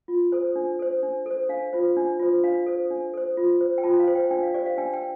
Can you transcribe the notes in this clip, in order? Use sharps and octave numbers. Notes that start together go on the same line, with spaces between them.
F4
A4 C5
D4
A4 C5
D4
A4 C5
D4 F5
F4 C5
D4
F4 C5
D4 F5
A4 C5
D4
A4 C5
F4
C5
G5
F4 A5
F5
C5
G5
D4 G5
F5
G4 C5 D5
F5
D4 G5
G5